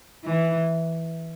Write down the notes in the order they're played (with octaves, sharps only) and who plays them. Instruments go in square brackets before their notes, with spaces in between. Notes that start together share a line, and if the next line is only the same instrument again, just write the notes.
[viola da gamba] E3